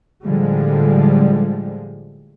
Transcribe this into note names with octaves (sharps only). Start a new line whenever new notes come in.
A2 D3 F3 G3 G#3